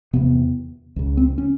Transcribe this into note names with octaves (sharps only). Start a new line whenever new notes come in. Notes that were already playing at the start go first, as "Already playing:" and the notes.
E2 C3 B3
C#2 C#3
C4
C#4